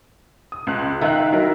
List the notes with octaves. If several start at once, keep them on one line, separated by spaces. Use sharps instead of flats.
D#6
C#2 F#6
D#3 E5 F5 F#6
F#3 E4 A#4